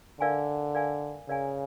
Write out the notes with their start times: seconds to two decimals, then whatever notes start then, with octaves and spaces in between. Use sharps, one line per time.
0.21 D3 A#4 D5 F5 G#5
0.75 A#4 D5 F5 G#5
1.29 C#3 A#4 D5 F5 G#5